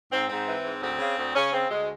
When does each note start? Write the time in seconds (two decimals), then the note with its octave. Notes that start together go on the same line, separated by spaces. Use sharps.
0.11 G#2 C4
0.28 G#2 C4
0.46 E3
0.64 G#2
0.81 D2 C4
0.99 C#3
1.16 D2
1.34 C#3 C#4
1.52 C#3 C4
1.69 D2 G#3